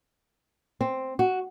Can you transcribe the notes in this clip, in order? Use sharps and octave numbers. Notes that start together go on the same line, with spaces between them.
C4
F#4